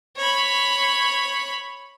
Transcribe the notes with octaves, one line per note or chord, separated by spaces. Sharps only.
C#5 B5